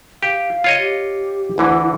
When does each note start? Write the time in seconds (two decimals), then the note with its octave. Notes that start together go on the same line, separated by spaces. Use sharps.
0.23 G4 F5
0.64 F4 C#5 D#5
0.79 G4
1.58 D2 D3 E3 E4 F#5